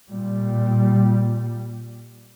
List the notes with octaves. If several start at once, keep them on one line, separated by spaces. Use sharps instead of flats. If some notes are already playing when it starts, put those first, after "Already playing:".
A#2 G3